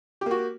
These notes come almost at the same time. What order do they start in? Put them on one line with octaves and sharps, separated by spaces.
G4 A#3 F#4